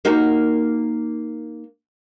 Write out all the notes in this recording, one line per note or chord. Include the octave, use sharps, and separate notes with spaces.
A#3 D#4 F#4